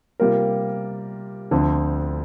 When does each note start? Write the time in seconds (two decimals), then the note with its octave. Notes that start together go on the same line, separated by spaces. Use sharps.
0.20 C3 G3 A#3 F4 A#4
1.51 D2 D3 F3 C4